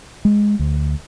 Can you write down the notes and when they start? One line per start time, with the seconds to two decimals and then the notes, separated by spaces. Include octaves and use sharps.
0.25 G#3
0.59 D2